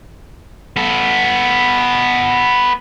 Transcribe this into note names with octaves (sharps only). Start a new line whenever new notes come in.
B3 A4